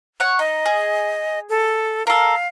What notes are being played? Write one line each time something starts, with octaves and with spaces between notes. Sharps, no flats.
C#5 F#5
D#4 D#5
G#4
A4
A4 A#4 F5